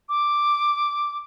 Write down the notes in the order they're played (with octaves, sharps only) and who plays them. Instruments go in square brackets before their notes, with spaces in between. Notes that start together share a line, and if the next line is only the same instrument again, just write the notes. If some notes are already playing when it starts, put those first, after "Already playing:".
[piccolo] D6